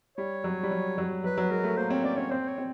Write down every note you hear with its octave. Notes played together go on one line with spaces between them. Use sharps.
G3 C#5
F#3
G3
F#3
F#3
F#3 B4
F#3
G#3 A#4
A3
A#3 C5
C4 C#5
C#4 D5
C#4 C#5
C4 C5
C#5
C4